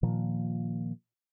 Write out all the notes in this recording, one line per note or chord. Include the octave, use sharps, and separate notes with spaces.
A#2 D#3 F3 A#3